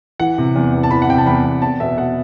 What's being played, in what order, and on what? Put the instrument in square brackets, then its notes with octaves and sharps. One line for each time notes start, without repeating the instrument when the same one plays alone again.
[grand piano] E3 F#5
C3
E2
E2
A5
E3 B5
F#5
C3 G5
A5
E2 B5
E2
E2 A5
B2 E5
B2 F#5